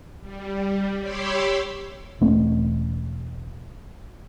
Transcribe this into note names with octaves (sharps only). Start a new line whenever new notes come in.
G3
G4 C#5 B5 C6 D6 E6
E1 A3 C4 C#4